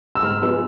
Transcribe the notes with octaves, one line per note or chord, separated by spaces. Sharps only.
E6
G#2 F6
F3 G#3 B3 E6